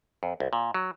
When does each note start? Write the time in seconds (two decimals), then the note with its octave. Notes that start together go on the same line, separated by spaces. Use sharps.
0.23 F2
0.40 C2
0.53 A#2
0.74 F#3